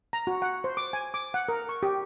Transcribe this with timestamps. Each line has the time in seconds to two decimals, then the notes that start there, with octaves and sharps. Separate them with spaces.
0.13 A#5
0.27 F#4
0.42 F#5
0.64 C5
0.77 D6
0.93 G#5
1.14 D6
1.34 F#5
1.49 A#4
1.69 C#6
1.83 G4